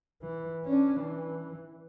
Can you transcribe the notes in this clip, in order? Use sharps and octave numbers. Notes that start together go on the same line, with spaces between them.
E3
C#4 D4
E3